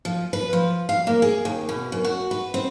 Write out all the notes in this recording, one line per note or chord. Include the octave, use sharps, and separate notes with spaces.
F3
B4
F3
F5
A#3
G#4
D#2
B2
F#2
F#4
B4
C4